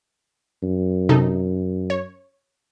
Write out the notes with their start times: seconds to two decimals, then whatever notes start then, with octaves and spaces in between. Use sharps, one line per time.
0.63 F#2
1.09 C3 D#4 A4
1.90 C#5